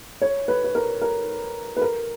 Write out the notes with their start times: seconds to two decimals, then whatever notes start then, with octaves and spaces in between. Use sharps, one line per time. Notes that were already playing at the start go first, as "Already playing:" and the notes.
0.22 C#5
0.48 B4
0.64 B4
0.75 A#4
1.02 A#4
1.77 B4
1.82 A#4